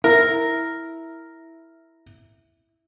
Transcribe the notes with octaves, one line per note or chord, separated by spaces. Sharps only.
E4 A#4